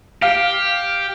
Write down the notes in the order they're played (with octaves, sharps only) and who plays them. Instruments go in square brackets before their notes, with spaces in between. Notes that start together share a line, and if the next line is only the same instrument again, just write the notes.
[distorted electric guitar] G4 [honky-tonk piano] F5